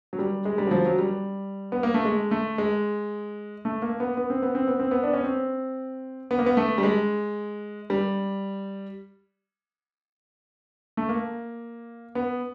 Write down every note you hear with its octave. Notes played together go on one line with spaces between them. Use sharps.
F#3
G3
G#3
G3
F#3
F3
F#3
G3
B3
A#3
A3
G#3
A3
G#3
A3
A#3
B3
B3
C4
B3
C4
B3
C4
B3
D4
C#4
C4
B3
A#3
B3
A3
G3
G#3
G3
A3
A#3
B3